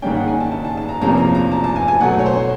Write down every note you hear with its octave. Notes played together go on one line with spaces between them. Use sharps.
G#2 D#3 G3 A#3 C#4 G5
F#5
G#5
A5
A5
A5
A5
A#5
E2 C3 F3 A#3 C#4 A#5
A#5
A#5
A5
A5
G#5
G#5
B2 F#3 A3 F#5
C#5
C5
C5